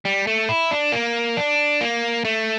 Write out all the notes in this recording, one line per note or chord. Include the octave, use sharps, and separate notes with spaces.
G3
A3
E4
D4
A#3
D4
A#3
A3